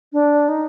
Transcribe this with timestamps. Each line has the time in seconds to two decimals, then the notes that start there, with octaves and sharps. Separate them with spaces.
0.13 D4
0.49 D#4